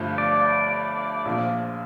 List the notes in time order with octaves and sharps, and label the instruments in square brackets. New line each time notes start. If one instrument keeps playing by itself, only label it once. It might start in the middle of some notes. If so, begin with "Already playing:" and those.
Already playing: [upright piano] G1 G2 F3 A3
[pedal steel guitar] D5
[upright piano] A#1 A#2 F3